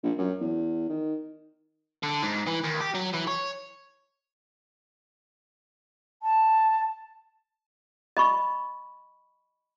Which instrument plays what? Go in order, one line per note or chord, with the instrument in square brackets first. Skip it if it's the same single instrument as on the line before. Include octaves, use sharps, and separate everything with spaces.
[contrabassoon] A#1
F#2
E2
D#3
[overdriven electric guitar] D3
G#2
E3
D#2
G4
F#3
E3
C#5
[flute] A5
[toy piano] D#5 B5 C#6